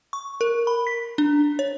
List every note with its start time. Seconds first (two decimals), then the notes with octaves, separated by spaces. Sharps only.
0.13 C#6
0.41 A#4
0.67 B5
0.87 B6
1.18 D4
1.59 C#5